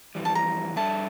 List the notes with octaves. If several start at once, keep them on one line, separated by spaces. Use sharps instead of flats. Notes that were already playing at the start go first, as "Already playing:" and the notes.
F2 E3 G3
A5
A#5
G3 D4 A4 E5 A5